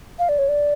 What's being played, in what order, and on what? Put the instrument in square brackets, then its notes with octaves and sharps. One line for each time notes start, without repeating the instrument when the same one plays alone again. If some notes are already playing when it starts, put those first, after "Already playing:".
[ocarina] F5
D5
C#5
D5